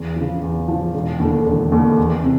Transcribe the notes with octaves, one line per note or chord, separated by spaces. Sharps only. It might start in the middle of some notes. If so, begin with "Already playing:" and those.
Already playing: E2
C#3 F3
E2
C#3 F3
E1
D#2 D3
E1
D#2 D3
E2
C3